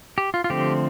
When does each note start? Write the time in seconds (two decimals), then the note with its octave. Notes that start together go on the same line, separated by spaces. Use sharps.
0.18 G4
0.34 F4
0.44 F4
0.50 D3 F3 A3 C4 G4